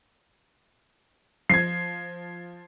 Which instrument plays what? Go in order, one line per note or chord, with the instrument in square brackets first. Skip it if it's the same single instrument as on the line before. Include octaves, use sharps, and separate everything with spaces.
[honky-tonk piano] F3 [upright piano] G#6 C7